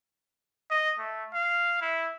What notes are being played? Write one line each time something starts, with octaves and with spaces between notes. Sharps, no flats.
D#5
A3
F5
E4